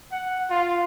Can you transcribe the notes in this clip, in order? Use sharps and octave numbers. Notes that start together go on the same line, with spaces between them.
F#5
F4